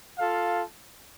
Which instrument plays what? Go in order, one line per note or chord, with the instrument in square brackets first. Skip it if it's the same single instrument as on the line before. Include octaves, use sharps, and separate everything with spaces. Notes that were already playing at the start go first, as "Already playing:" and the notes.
[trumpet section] F4 A4 F5